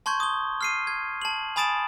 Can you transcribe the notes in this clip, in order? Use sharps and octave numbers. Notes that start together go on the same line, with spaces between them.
A5 C6 C#6 G6 G#6
D#6 G7
F6 C7 D#7
G#6
A5 F#7
G#5 B5 D#6 A6 D7 E7